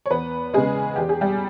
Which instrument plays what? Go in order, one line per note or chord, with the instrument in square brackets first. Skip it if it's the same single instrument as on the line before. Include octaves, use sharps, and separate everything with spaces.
[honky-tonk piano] C#5
E2 B3 B4
C#3 G#3 G#4
E2 G4
G#4
G3 G4